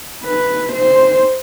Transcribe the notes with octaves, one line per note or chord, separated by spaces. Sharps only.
B4
C5